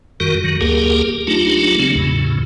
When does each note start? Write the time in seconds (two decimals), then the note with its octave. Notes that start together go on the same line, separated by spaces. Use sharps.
0.20 F#2 D#3 G3 F#4 A#4
0.44 F#2 D#3 F#3
0.61 D2 A#3 G4 G#4 A#4
1.27 F#3 A3 D4 D#4 F4 G4
1.79 C#3 F#3 A3 C4
1.96 E2 A2 C#3